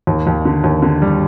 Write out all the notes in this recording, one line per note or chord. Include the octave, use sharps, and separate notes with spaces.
D#2
D#2
D3
D#2
D3
G3